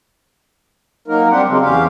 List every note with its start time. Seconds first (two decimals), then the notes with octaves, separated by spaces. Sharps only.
1.08 F#3 A#3 D#4 A#4
1.30 G3 C4 D4 G4 F#5
1.48 C#3 F#3 G#3 C4
1.62 E2 C#4 G4 F5